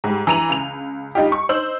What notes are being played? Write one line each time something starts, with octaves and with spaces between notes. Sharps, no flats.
G#2 G3
E3 A#5 D#7 F7 F#7
C#2 F7
G3 D#4 F4 G4
C#6
D#4 C5 E6 F#7